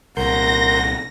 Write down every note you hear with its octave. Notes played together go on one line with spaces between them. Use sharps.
C2 A#2 A#4 F#5 C6 G6 A#6